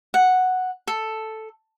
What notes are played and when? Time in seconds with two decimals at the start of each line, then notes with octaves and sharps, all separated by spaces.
0.14 F#5
0.87 A4